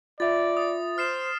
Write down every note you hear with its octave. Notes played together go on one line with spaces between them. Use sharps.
F4 D5 E5 A6
D#6
C5 F6 C7 E7